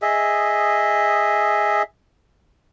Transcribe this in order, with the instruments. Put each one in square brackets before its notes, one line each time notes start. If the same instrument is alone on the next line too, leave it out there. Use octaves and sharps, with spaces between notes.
[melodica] G#4 D#5 E5